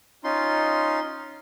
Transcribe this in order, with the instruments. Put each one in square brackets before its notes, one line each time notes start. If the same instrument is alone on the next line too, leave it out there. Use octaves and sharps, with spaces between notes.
[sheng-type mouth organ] C#4 D#4 F4 C6